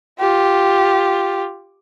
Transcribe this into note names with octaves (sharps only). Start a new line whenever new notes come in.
F4 G4